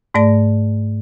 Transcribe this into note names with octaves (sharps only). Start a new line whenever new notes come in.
G#2 A3 D5 A#6